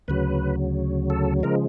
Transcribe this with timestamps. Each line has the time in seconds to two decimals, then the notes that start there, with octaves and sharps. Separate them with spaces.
0.08 D2 C#3 F#3 B4
1.10 A4
1.43 C#3 F3 G#3 A#4